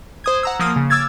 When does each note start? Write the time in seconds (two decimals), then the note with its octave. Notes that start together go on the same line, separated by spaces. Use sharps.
0.24 C5 D#6 G#6
0.43 F#5 A#5 E6
0.59 F3 A#3 D#6 F6
0.76 C#3
0.90 D6 E6 F6 G#6 A6